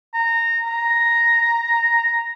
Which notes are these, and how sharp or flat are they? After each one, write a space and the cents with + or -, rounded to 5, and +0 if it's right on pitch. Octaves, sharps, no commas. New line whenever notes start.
A#5 -15
A#5 +0